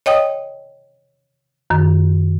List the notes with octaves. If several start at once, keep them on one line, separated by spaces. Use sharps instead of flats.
C#5 D#5 G5 D#6
F#2 D#3